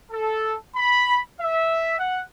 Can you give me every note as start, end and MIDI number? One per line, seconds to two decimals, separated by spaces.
0.12 0.55 69
0.76 1.19 83
1.40 1.94 76
1.98 2.21 78